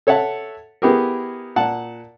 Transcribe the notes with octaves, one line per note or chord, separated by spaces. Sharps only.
A4 C#5 E5 F#5 A5
B3 E4 G4 G#4 A#4
A#2 F#5 A5